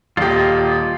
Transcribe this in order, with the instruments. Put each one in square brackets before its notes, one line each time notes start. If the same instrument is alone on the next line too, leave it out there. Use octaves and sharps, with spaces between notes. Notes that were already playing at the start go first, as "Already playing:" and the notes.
[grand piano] D#1 G4 [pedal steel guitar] F4 D#5